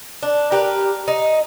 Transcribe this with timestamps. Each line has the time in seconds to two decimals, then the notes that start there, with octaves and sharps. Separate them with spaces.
0.23 D4
0.52 G4 A#4 B4
1.08 D#4